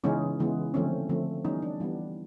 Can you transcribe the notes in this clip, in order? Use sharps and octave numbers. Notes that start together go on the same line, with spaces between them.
C#3 E3 G#3 B3 C#4 D#4
C#3 E3 G#3 B3
D3 F3 A3 C4 C#4
D3 F3 A3 C4
E3 G3 B3 C#4 D#4
D4
E3 G3 B3